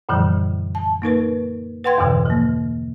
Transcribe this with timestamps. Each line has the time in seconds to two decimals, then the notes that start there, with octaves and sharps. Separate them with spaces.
0.09 F#2 A#2 D3 E3 F3 G3
0.75 A5
1.02 A#3 D#4 A#4 B4
1.84 B4 F#5 G5 C6 G#6
1.98 E2 G2 B2 D3 E3
2.26 F3 A#3